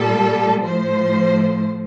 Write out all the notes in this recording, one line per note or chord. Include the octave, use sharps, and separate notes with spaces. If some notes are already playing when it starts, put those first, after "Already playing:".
Already playing: A#2 G3 A4
A2 F3 C5